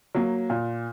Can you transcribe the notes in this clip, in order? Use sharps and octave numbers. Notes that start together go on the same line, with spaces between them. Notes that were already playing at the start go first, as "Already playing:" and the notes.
F#3 A#3
A#2